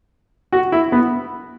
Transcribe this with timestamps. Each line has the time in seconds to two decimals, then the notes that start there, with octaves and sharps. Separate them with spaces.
0.53 F#4
0.72 E4
0.92 B3